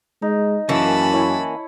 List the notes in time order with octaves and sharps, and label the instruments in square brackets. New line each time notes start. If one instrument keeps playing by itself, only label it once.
[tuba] G#3 [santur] D#4
[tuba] F#2 [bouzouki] E3 A#3 C#4 [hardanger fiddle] A5 B5
[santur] E4 C#5